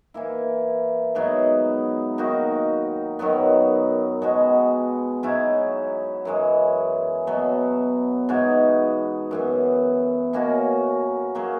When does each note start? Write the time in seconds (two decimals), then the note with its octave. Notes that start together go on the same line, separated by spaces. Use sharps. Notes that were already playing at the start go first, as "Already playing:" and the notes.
0.14 E3 A#3 E4
1.15 G#2 F#3 B3
2.18 D#3 A#3 D#4 F#4
3.19 F#2 D#3 F#3 B3
4.22 B2 G#3 B3 F#4
5.23 G#2 F#3 C#4 E4
6.25 F#2 E3 G#3
7.27 B2 F#3 B3
8.29 G#2 E3 B3 F#4
9.31 F#2 E3 B3
10.33 B2 A#3 C#4 F#4
11.35 C#3 F#3 A#3